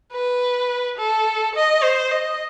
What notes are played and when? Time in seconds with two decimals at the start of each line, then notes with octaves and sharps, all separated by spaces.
0.12 B4
0.98 A4
1.55 D#5
1.83 C5
2.11 D#5